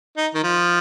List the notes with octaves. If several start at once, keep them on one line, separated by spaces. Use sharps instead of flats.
D#4
D#3
F3